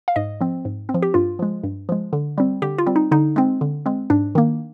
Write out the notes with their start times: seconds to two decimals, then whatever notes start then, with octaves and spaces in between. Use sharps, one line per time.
0.08 F5
0.16 G#2 D#5
0.41 F3 C4
0.65 G#2
0.89 C4
0.94 F3
1.02 G4
1.14 G2 F4
1.39 F3 G#3
1.64 G2
1.89 F3 G#3
2.13 D3
2.38 G3 C4
2.62 D3 G4
2.78 F4
2.86 G3 C4
2.96 D#4
3.11 D3 D#4
3.36 G#3 C4
3.61 D3
3.86 G#3 C4
4.10 G#2 D4
4.35 D#3 A#3